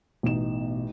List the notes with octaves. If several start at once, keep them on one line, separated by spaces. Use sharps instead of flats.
A1 B2 D#4 E7